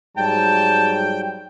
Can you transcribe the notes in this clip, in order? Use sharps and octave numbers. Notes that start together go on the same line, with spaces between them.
G#2 F#3 G3 G5 A5